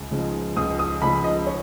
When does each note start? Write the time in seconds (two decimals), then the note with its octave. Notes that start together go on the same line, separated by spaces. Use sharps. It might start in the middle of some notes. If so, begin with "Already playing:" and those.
Already playing: C#2
0.11 C#3 F3 G#3 D#4
0.56 C#2 D#6
0.79 D#6
1.01 C#3 F3 G#3 D#4 B5
1.24 D#5
1.47 C#5